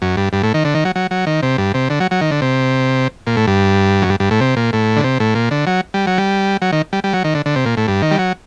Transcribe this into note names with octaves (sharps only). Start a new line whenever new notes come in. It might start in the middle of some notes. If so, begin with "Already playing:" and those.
F#2
G2
G2
A2
D#3
D3
D#3
F#3
F#3
F#3
D#3
C3
G2
C3
D3
F#3
F#3
D#3
D3
C3
A#2
A2
G2
F#2
G2
G2
A2
C3
A#2
A2
D3
C3
A2
A#2
D3
F#3
G3
F#3
G3
F#3
D#3
G3
G3
F#3
D#3
D3
D3
C3
A#2
A2
G2
D#3
G3
F#3